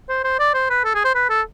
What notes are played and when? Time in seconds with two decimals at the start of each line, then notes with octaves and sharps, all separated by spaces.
0.09 C5
0.24 C5
0.39 D5
0.54 C5
0.70 B4
0.85 A4
0.95 G#4
1.05 C5
1.15 B4
1.30 A4